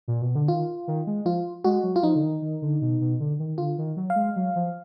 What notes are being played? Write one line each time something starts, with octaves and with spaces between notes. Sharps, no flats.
A#2
B2
D3
D#3 F4
D#3
G#3
F3 F4
G#3 F#4
F#3
F4
F3 D#4
D3
D#3
D#3
D3
B2
B2
D3
D#3
D3 F4
D#3
F#3
F5
G#3
F#3
F3